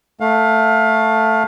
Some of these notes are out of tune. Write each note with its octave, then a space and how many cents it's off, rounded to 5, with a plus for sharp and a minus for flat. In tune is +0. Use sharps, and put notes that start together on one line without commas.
A3 +5 F5 +25